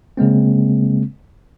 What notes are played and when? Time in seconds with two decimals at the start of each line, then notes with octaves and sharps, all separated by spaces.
0.17 C#3 G#3 A#3 C4